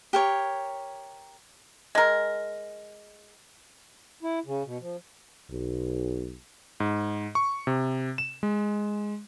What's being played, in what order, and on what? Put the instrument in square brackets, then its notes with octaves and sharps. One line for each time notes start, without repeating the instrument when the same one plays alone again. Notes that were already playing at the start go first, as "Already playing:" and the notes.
[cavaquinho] G4 A#4 C#5
[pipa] G#3 A#4
[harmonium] E4
C#3
B2
F3
[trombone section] B1
[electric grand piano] G#2
C#6
C3
E7
G#3